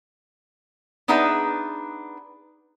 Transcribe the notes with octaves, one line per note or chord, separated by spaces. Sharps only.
B3 D4 D#4 G#4 B4 E5